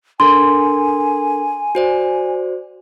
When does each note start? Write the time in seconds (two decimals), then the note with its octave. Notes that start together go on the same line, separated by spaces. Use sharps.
0.20 D4 A4 A#4 G#5 C6
1.75 F#4 C5 D5